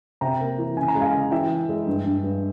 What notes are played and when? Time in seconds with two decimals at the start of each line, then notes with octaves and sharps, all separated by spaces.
0.21 C3 G5 A#5
0.40 A#3
0.58 E3
0.77 C#3 G#5
0.88 A#5
0.95 G#3
1.01 F5 G#5
1.14 C#3
1.31 E3 E5 G5
1.50 E4
1.69 G#3
1.87 G2
2.05 G2
2.24 G2